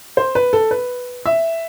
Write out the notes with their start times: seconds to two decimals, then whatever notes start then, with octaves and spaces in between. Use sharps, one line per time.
0.17 C5
0.35 B4
0.53 A4
0.71 B4
1.26 E5